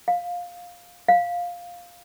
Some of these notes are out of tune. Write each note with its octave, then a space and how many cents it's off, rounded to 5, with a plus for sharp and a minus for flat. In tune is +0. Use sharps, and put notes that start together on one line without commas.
F5 +15
F5 +5